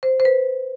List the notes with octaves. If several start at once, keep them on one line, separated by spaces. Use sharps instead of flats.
C5
C5
B4